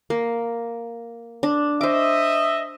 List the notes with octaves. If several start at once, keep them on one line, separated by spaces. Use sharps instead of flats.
A#3
D4
C5 D#5 E5 D6